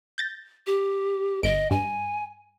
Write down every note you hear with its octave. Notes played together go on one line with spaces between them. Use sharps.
G6 A6 A#6
G4
G1 D#5 D7
G2 G#5